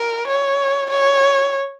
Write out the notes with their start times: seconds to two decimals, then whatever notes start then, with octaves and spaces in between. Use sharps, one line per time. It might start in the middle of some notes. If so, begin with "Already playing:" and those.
Already playing: A#4
0.28 C#5
0.91 C#5